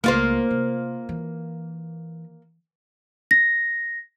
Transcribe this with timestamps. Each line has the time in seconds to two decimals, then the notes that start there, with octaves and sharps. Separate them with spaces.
0.04 C#2 A#3 F4 C5
0.50 C3
1.09 E3
3.31 A#6